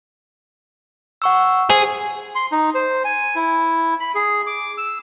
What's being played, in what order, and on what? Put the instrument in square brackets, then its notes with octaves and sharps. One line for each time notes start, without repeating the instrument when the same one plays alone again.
[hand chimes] F#5 C#6 E6
[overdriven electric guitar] G#4 [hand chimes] C5
[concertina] C6
D#4
C5
G#5
E4
B5
G#4
D6
E6